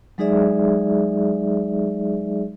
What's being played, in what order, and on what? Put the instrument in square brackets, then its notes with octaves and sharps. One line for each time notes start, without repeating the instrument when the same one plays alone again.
[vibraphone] F#3 G#3 D#4 G#4 D5 E5